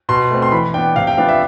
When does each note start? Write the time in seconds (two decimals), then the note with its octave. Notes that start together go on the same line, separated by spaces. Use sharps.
0.09 B2 C6
0.30 A3 C4
0.42 C6
0.52 E3 B5
0.74 D4 G5
0.78 B3
0.96 C3 F5
1.07 G5
1.17 F3 B3 D4 F5
1.29 E5